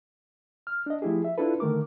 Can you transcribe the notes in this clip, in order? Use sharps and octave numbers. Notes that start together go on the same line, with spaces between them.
F6
D4 D#5
F3 A3 E4 G4 G#4
E5
D4 E4 F4 A4 B4
D3 D#3 A3 A#4 D6